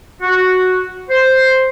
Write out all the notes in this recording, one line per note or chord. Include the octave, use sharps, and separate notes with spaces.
F#4
C5